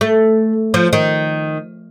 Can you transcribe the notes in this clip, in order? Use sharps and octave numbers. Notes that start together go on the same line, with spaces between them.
A3
F3
D#3